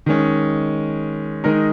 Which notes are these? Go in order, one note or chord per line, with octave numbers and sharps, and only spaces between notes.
D#3 G#3 C#4
D#3 G#3 D#4 A#4